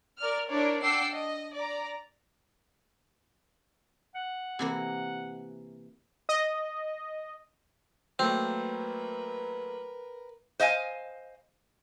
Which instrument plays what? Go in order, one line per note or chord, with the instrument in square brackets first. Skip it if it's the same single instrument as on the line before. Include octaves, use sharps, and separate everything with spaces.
[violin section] A#4 D5 F6
D4 E4 A#4 C#5 D5
D4 F#5 G5 D6 E6 C7
D#5
D5 A#5
[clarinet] F#5
[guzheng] C3 E3 A#3
[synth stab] D#5
[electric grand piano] F#3 A3 A#3 [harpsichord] C4 [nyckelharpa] A#4 B4
[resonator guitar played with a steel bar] C5 D#5 F5 G#5